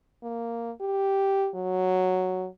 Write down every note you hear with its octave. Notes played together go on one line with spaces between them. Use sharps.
A#3
G4
F#3